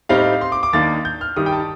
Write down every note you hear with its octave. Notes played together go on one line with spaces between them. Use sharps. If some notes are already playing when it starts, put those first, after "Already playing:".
A2 G3 C4 D#4 F5
C6
D6
D6
D#2 D#3 A#3 D4 A6
G6
F6
G2 D#3 G3 D#6
G5
A5